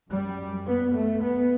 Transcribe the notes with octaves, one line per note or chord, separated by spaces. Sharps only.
F#2 G3
B3
A3
B3